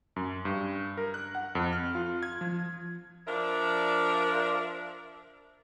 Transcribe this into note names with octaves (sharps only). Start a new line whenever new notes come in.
F#2
G2
A#4
F#6
F#5
F2
F6
F4
G#6
F3
F3 D4 A#4 D5 E5